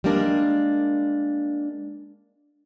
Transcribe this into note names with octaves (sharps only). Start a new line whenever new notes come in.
G3 G#3 A#3 D4 A#4